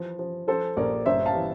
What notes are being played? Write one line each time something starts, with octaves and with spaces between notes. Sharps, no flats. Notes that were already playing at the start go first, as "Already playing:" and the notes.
Already playing: E3 F3
F3
F3 A4 C5
A#1 A#4 D5
G1 C5 E5
F5 A5
E3